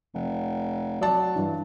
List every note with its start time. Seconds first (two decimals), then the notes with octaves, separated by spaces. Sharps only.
0.14 F1
1.01 F#3 D5 A5
1.36 G2 E3